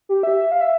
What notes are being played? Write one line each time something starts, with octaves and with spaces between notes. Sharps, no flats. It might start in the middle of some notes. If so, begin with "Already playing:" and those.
G4
E5
E5
F5
E5